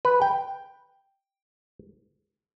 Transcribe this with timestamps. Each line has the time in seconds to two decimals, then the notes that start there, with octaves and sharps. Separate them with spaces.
0.05 B4
0.22 G5